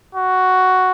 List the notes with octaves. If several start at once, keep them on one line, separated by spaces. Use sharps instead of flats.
F#4